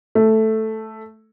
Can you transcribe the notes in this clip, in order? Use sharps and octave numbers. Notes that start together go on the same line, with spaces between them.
A3